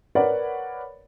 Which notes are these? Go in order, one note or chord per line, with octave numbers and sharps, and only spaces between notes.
A#4 B4 C#5 D5 F#5 B5